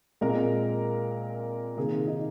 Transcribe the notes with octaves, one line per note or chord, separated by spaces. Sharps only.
A#2 G#3 C4 A#4
C3 D#3 A#3 G#4
D#4